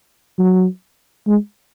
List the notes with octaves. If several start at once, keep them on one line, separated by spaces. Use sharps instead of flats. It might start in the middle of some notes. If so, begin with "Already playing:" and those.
F#3
G#3